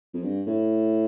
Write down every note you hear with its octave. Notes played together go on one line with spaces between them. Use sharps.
F2
G2
A2